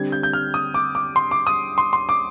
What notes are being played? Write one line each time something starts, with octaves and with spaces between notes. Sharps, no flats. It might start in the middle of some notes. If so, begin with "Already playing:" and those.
Already playing: D3 G3 C4 G#6
G6
G6
F6
D#6
D6
D6
C6
D6
D#6
C6
C6
D6